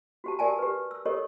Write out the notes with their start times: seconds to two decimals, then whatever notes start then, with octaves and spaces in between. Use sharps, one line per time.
0.24 F#4 G4 A5
0.39 G4 A#4 D5 G#5 A5
0.59 G4 B4
0.91 E6
1.05 G4 A4 A#4 C#5 D#5